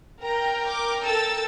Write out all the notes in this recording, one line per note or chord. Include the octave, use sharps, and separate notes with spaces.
A#4 G5 A#5
D6
A4 E6 A6